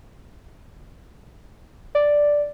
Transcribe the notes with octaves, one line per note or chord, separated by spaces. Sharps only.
D5